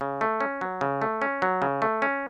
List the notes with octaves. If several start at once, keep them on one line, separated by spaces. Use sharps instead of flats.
C#3
A3
C#4
F#3
C#3
A3
C#4
F#3
C#3
A3
C#4